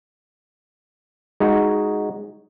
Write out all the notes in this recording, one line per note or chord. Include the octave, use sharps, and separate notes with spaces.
G#3 D#4 F#4